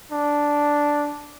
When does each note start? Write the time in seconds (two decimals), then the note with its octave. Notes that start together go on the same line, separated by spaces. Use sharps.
0.12 D4